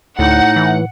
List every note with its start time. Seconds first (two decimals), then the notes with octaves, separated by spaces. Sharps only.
0.19 D2 A2 D#4 F#5
0.56 E3